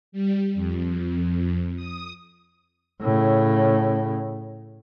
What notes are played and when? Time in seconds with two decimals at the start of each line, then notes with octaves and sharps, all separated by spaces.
0.12 G3
0.54 F2
1.76 D#6
3.01 A2 C#3